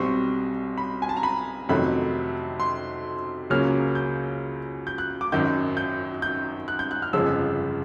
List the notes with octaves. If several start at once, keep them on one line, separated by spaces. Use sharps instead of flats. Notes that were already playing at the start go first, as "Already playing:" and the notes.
Already playing: B1 B2 G3 C4 C#6
B5
G#5
A5
A#5
B5
F2 C3 D#3 F#3 A3 B5
C6
C#2 C#3 F#3 A#3 C#4 F6
G6
G6
F#6
D6
G#1 F#2 D#3 G6
G6
G6
F#6
G6
F#6
F6
G1 F2 C#3 F3 G#3 E6